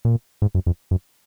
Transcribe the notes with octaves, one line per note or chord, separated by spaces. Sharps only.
A#2
G#2
F#2
F2
F#2